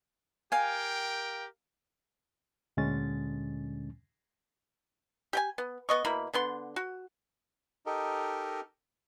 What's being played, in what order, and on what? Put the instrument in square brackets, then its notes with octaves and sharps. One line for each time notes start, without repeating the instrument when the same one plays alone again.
[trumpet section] G4 A#4 G5 [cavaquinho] F5 G#5
[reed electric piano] D2 A#2 D3 G#3 C#4 A6
[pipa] G4 G5 G#5
B3
B3 D#5 C#6
B2 A#3 E4 B5
D3 B3 C6
F#4
[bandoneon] D#4 G4 A4 A#4 D#5